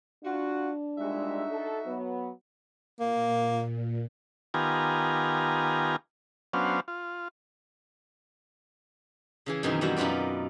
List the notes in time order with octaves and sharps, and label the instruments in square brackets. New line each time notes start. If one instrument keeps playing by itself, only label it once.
[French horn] D4 [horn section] F4 F#4
[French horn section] A#2 G3 G#3 [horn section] D#4 F#4 E5
[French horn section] A4
F#3 B3
[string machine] A#2 [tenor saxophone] A#3
[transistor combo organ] D#3 B3 F4 G4 G#5 A#5
F#3 B3 C#4 D4 C5 F5
F4
[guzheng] C#3 E3 G#4
F#2 B2 D#3 E3 C4 D#4
F#2 E3 G3 F#4
F#2 D#4 F4 F#4 B4 D5